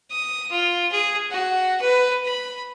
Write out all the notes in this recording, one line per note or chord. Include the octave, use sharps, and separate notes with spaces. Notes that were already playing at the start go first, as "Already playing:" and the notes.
D#6
F4
G#4
F#4
B4
B5